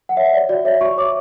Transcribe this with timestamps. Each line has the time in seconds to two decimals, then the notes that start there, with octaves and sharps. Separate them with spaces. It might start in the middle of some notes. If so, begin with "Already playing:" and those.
0.09 F#5
0.17 C#5 E5
0.33 C#5 D5
0.49 F#4 D5
0.65 C#5 E5
0.81 F#4 C#6
0.97 C#5 D6